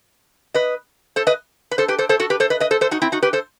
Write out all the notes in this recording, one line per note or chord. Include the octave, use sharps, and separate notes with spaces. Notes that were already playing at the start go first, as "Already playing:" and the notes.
B4 D#5
A4 C5
B4 D#5
B4
A4 C5
G4 B4
A4 C5
A4 C5
F#4 A4
G4 B4
A4 C5
B4 D#5
B4 D#5
A4 C5
A4 C5
D#4 F#4
C4 E4
D#4 F#4
G4 B4
A4 C5